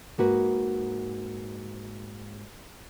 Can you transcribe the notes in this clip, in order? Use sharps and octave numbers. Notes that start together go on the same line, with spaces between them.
G#2 A#3 F#4 B4